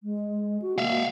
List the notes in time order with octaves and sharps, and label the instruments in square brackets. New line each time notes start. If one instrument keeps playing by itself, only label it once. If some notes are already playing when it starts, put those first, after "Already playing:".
[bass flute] G#3
F#4
[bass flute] A#3 [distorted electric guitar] E5 F5